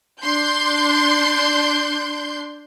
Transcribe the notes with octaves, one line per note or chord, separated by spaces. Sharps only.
D4 C6 G6